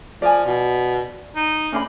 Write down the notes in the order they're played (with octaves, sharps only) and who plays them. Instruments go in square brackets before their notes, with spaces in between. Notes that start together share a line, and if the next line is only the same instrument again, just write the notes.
[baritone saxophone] F3 [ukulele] D5 G#5
[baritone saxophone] B2
D#4
[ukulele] C#4 D4 B5